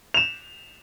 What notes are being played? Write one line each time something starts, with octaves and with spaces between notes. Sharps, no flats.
E7 F7